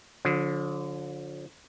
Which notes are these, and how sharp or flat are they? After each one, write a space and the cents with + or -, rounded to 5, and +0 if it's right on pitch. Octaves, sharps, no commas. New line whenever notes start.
D3 -20 F3 +35